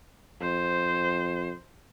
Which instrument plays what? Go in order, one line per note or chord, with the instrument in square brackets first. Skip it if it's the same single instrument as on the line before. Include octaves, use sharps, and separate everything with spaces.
[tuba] F2 [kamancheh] C5